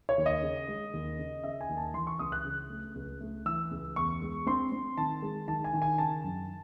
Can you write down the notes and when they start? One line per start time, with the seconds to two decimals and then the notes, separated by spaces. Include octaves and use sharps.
0.09 C#5
0.18 D#2
0.26 D#5
0.43 C#3
0.68 G#3
0.93 D#2
1.18 C#3
1.43 C#3 E5
1.61 G#5
1.69 D#2
1.77 A5
1.94 E3 C6
2.07 C#6
2.19 C#2 D#6
2.32 F#6
2.45 C#3
2.70 A3
2.95 C#2
3.21 A3
3.46 E3 E6
3.71 C#2
3.96 E2 C#6
4.22 G#3
4.47 C4 C6
4.72 C4
4.97 D#3 A5
5.22 G#3
5.48 D#3 A5
5.64 G#5
5.73 D#3
5.82 G#5
5.98 C#3 A5
6.24 F#2